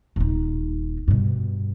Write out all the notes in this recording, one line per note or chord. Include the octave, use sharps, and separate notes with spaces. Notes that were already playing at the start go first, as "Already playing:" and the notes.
D#1 D#4
G2 B2